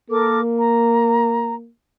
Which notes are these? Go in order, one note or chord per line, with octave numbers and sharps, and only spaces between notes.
A#3 A4 A#4 D6
A#5